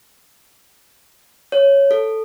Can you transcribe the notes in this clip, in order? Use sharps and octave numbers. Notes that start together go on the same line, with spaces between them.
C#5
A4